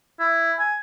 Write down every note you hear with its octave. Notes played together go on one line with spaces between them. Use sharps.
E4
G#5